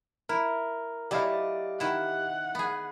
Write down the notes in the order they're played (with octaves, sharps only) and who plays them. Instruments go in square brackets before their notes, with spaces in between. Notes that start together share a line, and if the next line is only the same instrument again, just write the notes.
[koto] E4 [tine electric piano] A#4
[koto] F#3 A3 E4 [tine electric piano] G4 F5 [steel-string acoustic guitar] D5 D#5
[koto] D#3 E4 [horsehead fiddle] F#5
[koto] B3 G#4